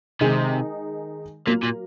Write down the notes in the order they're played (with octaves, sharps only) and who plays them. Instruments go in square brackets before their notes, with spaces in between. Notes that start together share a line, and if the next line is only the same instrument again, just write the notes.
[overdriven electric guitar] C3 [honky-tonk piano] D#3 G#3 D#4 G#4
[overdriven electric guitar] A#2 [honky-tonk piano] F#3 A#3 F4 A#4
[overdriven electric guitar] A#2